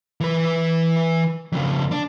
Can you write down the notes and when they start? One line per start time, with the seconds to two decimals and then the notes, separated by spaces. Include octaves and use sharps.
0.20 E3 B4
1.52 F2 C#3
1.92 D4